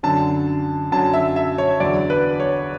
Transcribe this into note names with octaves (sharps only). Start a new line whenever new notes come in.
F#2 D3 F#3 A5
F#2 D3 F#3 A5
E5
E5
C#5
E2 D3 F#3 D5
B4
C#5